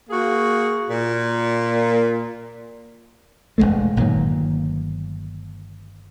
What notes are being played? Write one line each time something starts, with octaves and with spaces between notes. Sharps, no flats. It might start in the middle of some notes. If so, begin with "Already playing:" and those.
A#3 F#4 G#4
A#2
E1 C#2 G#3 A3
G1 A#2 D#3 F#3